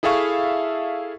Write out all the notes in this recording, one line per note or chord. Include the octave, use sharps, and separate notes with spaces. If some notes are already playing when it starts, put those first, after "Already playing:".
E4 G#4 A4 E5 F5 C#6